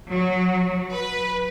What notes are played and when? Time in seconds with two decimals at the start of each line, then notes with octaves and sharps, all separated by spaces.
0.12 F#3
0.94 B4